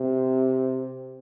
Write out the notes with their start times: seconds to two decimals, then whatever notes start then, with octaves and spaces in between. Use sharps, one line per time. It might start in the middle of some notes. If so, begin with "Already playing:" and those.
Already playing: C3